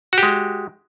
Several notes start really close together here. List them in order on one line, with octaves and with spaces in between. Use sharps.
F#4 G4 G#3